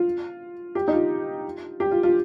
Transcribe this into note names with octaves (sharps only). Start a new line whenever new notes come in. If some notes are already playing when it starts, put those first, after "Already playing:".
Already playing: F4
G4
D#4
F4
G4
F4
F4